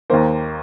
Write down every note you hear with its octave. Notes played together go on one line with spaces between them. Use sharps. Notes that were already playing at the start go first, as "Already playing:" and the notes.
D#2 D#3 A#3 C5